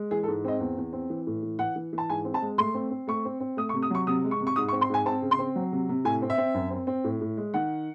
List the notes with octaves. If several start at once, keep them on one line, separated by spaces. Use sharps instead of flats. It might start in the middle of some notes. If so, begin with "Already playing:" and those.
Already playing: G#3
E3 G#4
A4
G#2
C4 D#5
E2
E2
C4
E3
A2
E3
E3 F#5
E3
E3
A5
G#2 G#5
C4
A5
G#3
A3 C6
C4
C4
A3 C#6
C4
C4
A3 D#6
C#6
C3
D#6
F#3 C#6
C3 D#6
G#3
C#6
C3
C#6
G#2 D#6
C#6
C4
C6
G#2 G#5
C4 A5
C#3
C6
C4
F#3
C3
C3
A2 G#5
C4
E5
C4
F#2
C4
C4
A2
A2
G#3
D#3 F#5